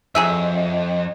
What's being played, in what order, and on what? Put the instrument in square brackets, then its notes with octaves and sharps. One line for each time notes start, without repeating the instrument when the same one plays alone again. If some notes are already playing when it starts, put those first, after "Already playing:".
[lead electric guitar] F2 [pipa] F#3 G#4 E5